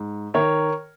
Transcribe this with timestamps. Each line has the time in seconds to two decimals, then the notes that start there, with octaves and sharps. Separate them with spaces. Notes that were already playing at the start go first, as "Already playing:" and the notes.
Already playing: G#2
0.34 D#3 A#4 C#5